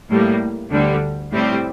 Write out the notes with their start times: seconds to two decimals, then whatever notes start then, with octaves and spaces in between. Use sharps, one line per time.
0.10 A2 G3 A#3
0.71 D2 D3 G3
1.32 A2 G3 C4 G4